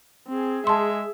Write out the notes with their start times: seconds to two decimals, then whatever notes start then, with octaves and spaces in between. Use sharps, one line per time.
0.29 C4 G#4
0.67 G#3 E5 A5 C6